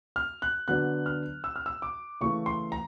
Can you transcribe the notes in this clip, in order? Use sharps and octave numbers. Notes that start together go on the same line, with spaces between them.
F6
F#6
D3 F#3 B3 D4 F#6
F6
E6
F6
E6
D6
C#3 E3 A3 C#6
C6
A#5